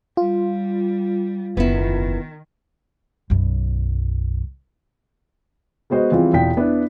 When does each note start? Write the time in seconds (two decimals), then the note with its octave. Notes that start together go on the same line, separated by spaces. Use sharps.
0.17 G3 F4
1.57 F#1 E2 D#3 B3 E4
3.30 B1 F#2
5.90 G#3 B3 F#4 C5 D#5
6.12 E3 F3 G3 C4 F4 G#4
6.33 E1 E2 F4 G5 B6
6.57 B3 D4 E4